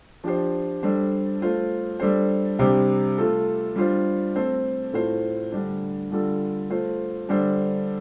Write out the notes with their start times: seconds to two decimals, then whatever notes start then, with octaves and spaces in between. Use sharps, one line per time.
0.24 F3 D4 G4 C5
0.83 G3 D4 A4 C5
1.42 A3 F4 C5
2.00 G3 D4 A4 C5
2.59 C3 G3 D4 G4 C5
3.18 A3 F4 A4
3.76 G3 D4 F4 C5
4.36 A3 C4 A4 C5
4.93 A2 A3 F4 C5
5.52 D3 G3 D4
6.11 D3 G3 F4 A4
6.70 A3 F4 C5
7.29 D3 G3 D4 A4 C5